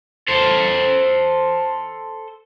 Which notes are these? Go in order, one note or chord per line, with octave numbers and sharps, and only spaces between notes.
A4 C5